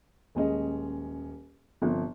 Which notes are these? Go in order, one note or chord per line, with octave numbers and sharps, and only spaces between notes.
D#1 G#3 C#4 D#5
G1 C3 F3